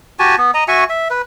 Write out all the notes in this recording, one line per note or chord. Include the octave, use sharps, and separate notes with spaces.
F#4 G4 G#5 A5
B3
D#5 A#5
F#4 E5 G#5 C#6
E5
B4